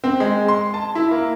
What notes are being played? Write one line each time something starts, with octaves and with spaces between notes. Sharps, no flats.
C4
G#3
C6
A5
E4
A#3